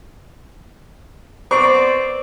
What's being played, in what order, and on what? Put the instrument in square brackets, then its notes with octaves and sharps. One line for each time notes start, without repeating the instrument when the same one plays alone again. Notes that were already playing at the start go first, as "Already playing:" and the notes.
[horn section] B3 C4 D5 [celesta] C5 D6 [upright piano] C#6